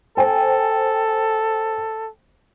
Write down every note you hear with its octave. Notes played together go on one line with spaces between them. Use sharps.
A4 C5 G5 G#5